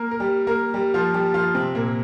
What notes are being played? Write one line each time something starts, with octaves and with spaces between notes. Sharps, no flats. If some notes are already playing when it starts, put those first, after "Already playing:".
Already playing: A#3 A#4
A#4
G3 G4
A#3 A#4
G3 G4
F3 F4
G3 G4
F3 F4
C3 C4
A#2 A#3